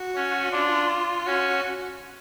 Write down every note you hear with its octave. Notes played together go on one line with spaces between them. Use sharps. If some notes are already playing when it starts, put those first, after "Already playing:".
Already playing: F#4
C#4
D4 F4
C#4 F#4